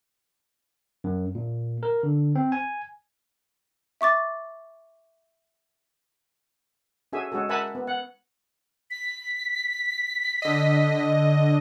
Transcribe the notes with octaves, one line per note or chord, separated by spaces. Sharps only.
F#2
A#2
A#4
D3
C4
G#5
E5 C#6 D6 A6
C#4 F#4 G#4 A4 E5 G#5
G#3 C#4 F#4 G#4 A4
A#4 E5 F#5 G#5 A5 B5
B3
F#5
B6
D3 D#5